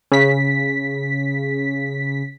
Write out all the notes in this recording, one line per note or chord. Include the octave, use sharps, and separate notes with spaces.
C#3 B6